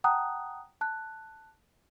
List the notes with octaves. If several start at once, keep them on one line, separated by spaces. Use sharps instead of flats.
F#5 G5 A5 A#5 D#6 F#6
A5 F#6